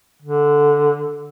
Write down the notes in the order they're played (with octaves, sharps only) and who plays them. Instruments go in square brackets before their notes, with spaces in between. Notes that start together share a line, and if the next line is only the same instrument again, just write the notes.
[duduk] D3